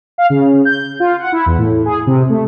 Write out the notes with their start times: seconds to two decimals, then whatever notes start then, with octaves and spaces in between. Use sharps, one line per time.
0.18 F5
0.30 C#3
0.65 G6
1.00 F4
1.19 F#5
1.32 E4
1.46 E2
1.58 A2
1.85 G#4
2.07 C3
2.30 A3